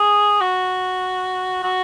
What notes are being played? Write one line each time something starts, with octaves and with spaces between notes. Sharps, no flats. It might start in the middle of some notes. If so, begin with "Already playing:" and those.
Already playing: G#4
F#4
F#4